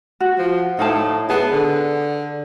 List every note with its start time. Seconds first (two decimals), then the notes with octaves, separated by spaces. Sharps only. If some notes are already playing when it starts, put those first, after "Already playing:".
0.20 F#4
0.38 F3
0.79 A2 D#4 F5 A5
1.30 B3 G#4 A5
1.52 D3